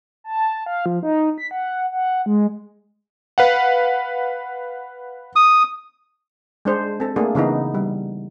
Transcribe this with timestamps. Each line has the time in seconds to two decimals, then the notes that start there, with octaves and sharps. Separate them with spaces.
0.24 A5
0.66 F5
0.86 F3
1.03 D#4
1.38 B6
1.51 F#5
1.91 F#5
2.26 G#3
3.38 B4 F5 F#5
5.36 D#6
6.65 G#3 D4 C5
7.00 C4 A4
7.16 A3 A#3 D4 G#4
7.35 C#3 E3 B3 D#4
7.74 G3